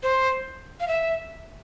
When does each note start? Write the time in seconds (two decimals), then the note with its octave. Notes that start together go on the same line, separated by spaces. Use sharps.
0.03 C5
0.80 F5
0.88 E5